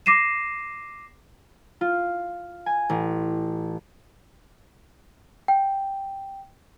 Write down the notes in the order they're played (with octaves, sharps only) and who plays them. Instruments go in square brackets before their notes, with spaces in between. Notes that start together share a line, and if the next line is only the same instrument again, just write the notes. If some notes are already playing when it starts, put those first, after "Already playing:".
[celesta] D6 A#6 C7 D#7 E7
[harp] F4
G#5
A1
[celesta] G5